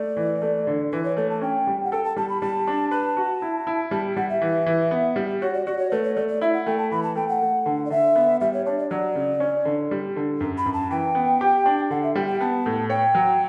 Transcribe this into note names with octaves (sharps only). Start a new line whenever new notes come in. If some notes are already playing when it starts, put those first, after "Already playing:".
Already playing: A3 D5
E3
A3
D3
E3 B4
C#5
A3 C#5
A5
C#4 G5
G3
F#5
A4 G5
A5
G3 A5
B5
G3 A5
D4
B4 A5
F#4
E4
E4
G3 A5
G3 F#5
E5
E3
E3
B3
G3
F#4 C#5
D5
F#4 D5
C#5
A3 B4
C#5
A3 D5
D5
E4 E5
F#5
A3 G5
A5
E3 B5
A5
A3 G5
F#5
A3
D3
D5
D3 E5
B3
G3 E5
C#5
D4 C#5
D5
F#3 D5
C#3
C#4
D3
G3
D3
F#2
B5
F#2
A5
E3 G5
B3
G4
D4
D3 F#5
E5
G3 G5
G5
B3 A5
A2
C#5 G5
F#3